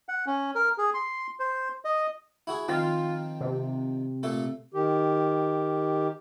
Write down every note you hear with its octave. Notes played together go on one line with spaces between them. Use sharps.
F#5
C#4
A#4
G#4
C6
C5
D#5
E4 F#4 G#4
D#3 F3 C4 F4
C3
A#2 A3 A4
D#3 G4